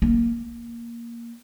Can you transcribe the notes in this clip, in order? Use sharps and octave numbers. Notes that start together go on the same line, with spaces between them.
A#3